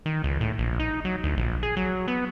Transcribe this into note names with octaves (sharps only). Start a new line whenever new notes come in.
D#3
C#2
A2
A#1
D#4
F#3
D2
A#1
G#4
F#3
B3